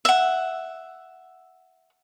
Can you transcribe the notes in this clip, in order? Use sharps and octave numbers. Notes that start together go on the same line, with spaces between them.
E5 F#5